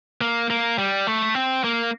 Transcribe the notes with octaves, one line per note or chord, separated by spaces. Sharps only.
A#3
A#3
G3
A3
C4
A#3